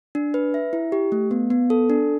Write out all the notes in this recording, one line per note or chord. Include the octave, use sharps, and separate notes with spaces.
D4
B4
E5
E4
G4
A3
B3
B3
A4
D4